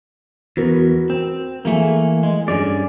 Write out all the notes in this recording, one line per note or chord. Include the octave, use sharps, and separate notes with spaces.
E2 F#4 A#4 B4
C4
E3 A3 A#3 G#4
G#3
G2 C#4 G#4 D5